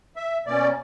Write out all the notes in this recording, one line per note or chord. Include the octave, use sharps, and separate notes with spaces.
E5
B2 A#3 C#4 D5